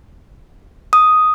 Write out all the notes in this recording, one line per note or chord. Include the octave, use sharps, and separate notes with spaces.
D#6